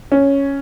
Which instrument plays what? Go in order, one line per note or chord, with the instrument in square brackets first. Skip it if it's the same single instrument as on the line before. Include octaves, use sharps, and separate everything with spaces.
[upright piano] C#4